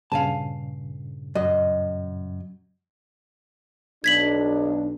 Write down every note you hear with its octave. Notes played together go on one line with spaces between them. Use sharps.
G2 A#2 C#3 F5 G#5 A5
F#2 D#5
B1 D4 G#6 B6 F#7